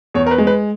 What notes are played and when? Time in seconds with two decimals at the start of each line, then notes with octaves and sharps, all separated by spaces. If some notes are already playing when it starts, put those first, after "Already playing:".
0.14 E2 C#5
0.26 A#4
0.31 B4
0.38 G#3
0.47 B4